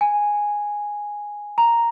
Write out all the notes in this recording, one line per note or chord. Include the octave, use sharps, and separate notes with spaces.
G#5
A#5